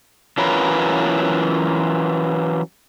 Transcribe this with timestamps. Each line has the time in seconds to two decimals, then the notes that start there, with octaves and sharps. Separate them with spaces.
0.38 E3 F#3 C#4 F4 A#4 B4